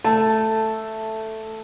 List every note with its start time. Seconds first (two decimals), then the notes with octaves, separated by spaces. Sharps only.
0.05 A3 A5